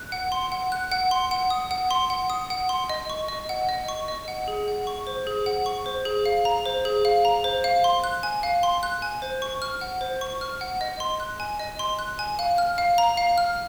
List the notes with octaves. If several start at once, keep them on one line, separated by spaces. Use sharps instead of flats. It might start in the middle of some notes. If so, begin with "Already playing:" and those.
Already playing: F#6
F#5
C6
F#5
F#6
F#5
C6
F#5
D#6
F#5
C6
F#5
D#6
F#5
C6
D#5
C#6
D#5
F#5
D#5
C#6
D#5
F#5
G#4
F#5
C#6
C5
G#4
F#5
C#6
C5
G#4
F5
A#5
C5
G#4
F5
A#5
C5
F5
C6
F#6
G#5
F5
C6
F#6
G#5
C5
C#6
F6
F#5
C5
C#6
F6
F#5
D#5
C6
F#6
G#5
D#5
C6
F#6
G#5
F5
F6
F5
A#5
F5
F6